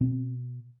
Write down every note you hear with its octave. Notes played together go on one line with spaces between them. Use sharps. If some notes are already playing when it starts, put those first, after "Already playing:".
B2 C4